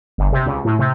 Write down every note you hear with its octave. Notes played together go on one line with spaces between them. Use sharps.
G1
C3
C#2
A2
C3